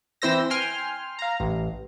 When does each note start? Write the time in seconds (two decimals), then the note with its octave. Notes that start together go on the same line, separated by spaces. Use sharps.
0.22 E3 C4 E4 C5 E6 A#6
0.50 G5 G#5 C6 F6
1.19 F5 A#5
1.40 A1